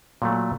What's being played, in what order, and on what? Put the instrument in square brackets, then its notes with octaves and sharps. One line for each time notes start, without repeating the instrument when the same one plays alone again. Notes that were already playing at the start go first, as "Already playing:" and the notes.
[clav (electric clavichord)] A#2 F#3 A3